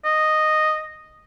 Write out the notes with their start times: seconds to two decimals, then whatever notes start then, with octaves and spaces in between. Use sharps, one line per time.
0.05 D#5